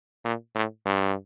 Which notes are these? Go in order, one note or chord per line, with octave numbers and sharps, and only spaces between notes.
A#2
A2
G2